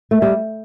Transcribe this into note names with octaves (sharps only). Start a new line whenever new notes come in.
A3
G3